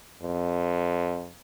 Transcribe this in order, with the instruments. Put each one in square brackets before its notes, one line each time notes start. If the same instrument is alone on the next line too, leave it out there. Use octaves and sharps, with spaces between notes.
[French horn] F2